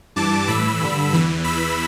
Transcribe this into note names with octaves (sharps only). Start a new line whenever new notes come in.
G2 E3 A5 D6
A2 E3 B5 E6
G2 D3
E2 E3
E2 E3 B5 E6